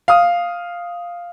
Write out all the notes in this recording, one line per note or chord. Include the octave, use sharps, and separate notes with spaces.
F5 D#6